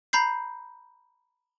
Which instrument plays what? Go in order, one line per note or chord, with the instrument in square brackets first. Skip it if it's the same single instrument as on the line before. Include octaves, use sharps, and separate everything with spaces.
[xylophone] A#5 B5 G6 C7